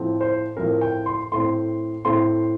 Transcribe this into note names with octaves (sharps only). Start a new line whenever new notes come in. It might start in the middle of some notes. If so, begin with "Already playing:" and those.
Already playing: A2 F3 C4
C5
A2 F3 C4 A#4
G5
C6
A2 A3 C4 C6
A2 A3 C4 C6